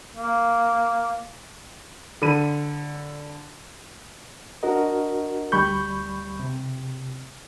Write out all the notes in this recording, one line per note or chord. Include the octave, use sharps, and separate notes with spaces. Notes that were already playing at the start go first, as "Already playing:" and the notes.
A#3
D3 B5 D#7
D4 F#4 A#4 D#5
D2 G3 B5 C#6 G6
C3